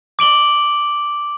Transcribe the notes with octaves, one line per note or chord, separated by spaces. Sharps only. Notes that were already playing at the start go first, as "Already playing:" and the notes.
D6 D7 F#7 G7